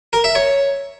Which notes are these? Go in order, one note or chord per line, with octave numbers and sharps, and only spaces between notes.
A#4
E5
C#5